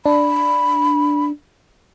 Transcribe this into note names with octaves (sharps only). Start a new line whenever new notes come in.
D4 B5